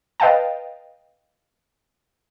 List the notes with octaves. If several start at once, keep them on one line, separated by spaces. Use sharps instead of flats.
B4 D#5 F5 G5 A5